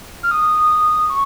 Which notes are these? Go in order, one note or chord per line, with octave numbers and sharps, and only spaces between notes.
F6
D#6
C#6